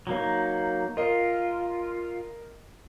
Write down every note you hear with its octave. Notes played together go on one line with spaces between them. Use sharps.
F#3 A#3 D#4
F4 A#4 D#5